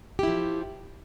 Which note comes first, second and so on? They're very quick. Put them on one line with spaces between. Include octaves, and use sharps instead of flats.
G4 E4 F3